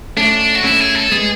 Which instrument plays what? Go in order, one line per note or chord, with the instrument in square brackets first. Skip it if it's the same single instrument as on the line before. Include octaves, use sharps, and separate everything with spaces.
[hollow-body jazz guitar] A3 C#4 [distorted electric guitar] D4
[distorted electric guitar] F#4
[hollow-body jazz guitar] A3 C#4 [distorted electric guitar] E4
[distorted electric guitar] G#4
A4
[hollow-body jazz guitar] G#3 B3 [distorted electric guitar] G#4